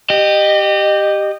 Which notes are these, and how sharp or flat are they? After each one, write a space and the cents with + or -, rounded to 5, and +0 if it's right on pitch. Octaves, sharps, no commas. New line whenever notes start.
G4 +0 D#5 -25